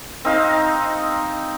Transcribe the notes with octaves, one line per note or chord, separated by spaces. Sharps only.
C4 D#4 F5